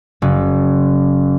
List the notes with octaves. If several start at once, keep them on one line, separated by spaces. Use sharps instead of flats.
F#1